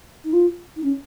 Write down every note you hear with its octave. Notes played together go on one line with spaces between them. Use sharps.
D#4
F4
D#4
C#4